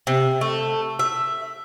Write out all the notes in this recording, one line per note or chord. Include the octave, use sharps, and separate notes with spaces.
C3
A3
E5